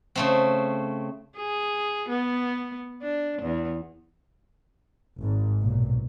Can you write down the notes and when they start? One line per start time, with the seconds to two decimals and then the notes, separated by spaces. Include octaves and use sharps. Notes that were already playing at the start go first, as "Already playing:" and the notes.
0.15 C#3 A3 C4
1.36 G#4
2.09 B3
3.02 D4
3.42 E2
5.21 G#1 G#2
5.62 B1 A#2